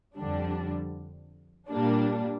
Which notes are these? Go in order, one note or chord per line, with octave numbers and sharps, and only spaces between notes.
F2 D3 G3 D4
A#2 G3 A#3 D4